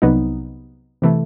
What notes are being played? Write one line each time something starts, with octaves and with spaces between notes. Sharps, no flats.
C2 C3 F#3 B3 D#4
C3 E3 A3